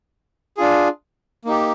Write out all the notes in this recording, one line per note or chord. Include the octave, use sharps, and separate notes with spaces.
D4 F4 G#4
A#3 D#4 G4